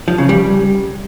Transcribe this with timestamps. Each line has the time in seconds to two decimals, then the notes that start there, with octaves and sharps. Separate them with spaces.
0.08 F3
0.18 C#3
0.29 G3